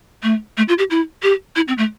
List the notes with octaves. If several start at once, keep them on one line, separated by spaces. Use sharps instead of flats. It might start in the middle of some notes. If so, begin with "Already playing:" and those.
A3
A3
F4
G4
E4
G4
E4
C4
A3